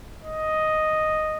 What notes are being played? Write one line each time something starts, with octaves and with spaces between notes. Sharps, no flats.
D#5